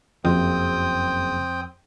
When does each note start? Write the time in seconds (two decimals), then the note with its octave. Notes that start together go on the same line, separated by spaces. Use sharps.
0.25 F#1 F2 C4 G5 D#6